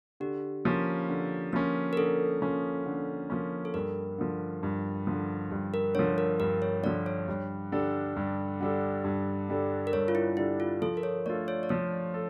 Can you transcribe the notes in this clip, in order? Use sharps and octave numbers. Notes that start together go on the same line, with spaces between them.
D3 G4
F3 A#3 C#4
D3
F3 A#3 C#4
A#4
D3 A4
F3 A#3 C#4
D3
F3 A#3 C#4
A4
G2 A#4
D3 F3
G2
D3 F3
G2
A#4
D3 F3 C#5
A#4
G2 A#4
C#5
D3 F3 D5
C#5
G2
D3 G3 D4 A4
G2
D3 G3 D4 A4
G2
D3 G3 D4 A4
A#4
G2 C#5
F4
E4
D3 G3 D4 E4 A4
F4
F3 A4
A#4
C#5
A3 D4 F4 A4 D5
C#5
D5
F3 C#5
A4